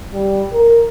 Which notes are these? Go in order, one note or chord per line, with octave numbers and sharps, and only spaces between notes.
G3
A#4